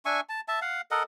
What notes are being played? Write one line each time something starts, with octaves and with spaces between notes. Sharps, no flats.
D4 E5 G#5 C#6
A5
E5 A5
F5 F#5
A4 A#4 D#5 F#5